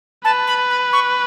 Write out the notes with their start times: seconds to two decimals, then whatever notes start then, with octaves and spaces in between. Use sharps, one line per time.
0.25 B4 A5
0.47 B5
0.70 B5
0.93 C#6